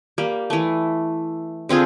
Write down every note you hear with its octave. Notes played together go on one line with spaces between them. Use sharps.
G3 A#3
E3 A3
D3 C4 F4 G#4